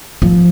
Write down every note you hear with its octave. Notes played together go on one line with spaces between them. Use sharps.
F3